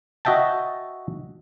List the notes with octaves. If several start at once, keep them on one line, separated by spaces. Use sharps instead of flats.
F#4 D#5 E5 G5 A5